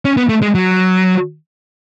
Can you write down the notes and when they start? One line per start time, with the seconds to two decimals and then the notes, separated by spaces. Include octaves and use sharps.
0.05 C#4
0.17 B3
0.29 A3
0.42 G#3
0.55 F#3